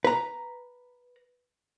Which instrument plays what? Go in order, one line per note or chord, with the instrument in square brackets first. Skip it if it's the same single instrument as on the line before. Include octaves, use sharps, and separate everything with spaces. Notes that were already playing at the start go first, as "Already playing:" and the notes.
[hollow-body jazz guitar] B4 A#5